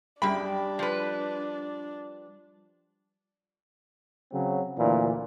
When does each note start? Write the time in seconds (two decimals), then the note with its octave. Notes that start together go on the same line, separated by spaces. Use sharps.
0.22 F#2 G3 D4 G#4 G5 B5
0.79 F3 B4
4.32 C#3 F#3 C4
4.78 D2 A#2 E3